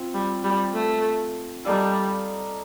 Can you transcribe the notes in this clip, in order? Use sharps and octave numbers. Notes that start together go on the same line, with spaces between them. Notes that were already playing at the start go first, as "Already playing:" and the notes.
Already playing: C4 F4
G3
G3
A3
G3 D#4 A4 D5 F5